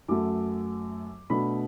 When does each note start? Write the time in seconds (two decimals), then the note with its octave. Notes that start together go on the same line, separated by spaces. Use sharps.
0.08 F#2 F#3 A3 D6
1.30 B2 A3 D4 B5